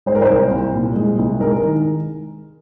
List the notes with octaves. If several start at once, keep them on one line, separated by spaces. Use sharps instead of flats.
G#3 C5
A#4
C5
C2
C2
A#2
G#3
C2
G#3 A#4
D#3